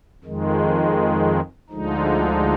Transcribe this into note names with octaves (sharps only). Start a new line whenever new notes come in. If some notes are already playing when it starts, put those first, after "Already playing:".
F2 D#3 G#3
D2 D3 F3 G#3 D#4